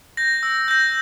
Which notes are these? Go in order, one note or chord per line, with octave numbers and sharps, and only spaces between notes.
G6 A#6
E6
G6 A#6